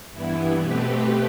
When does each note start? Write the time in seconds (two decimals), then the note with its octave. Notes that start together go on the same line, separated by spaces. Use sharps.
0.12 G2 E3 B3 E4
0.60 B2 A3 C4 G4 B4